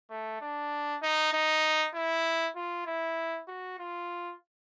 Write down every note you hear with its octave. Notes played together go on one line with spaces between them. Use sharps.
A3
D4
D#4
D#4
E4
F4
E4
F#4
F4